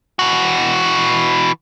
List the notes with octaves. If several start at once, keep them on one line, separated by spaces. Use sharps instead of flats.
E3 F#4